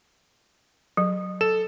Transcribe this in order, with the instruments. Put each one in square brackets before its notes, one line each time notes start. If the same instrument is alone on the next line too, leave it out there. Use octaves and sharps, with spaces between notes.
[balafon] F#3
[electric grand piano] A4 E7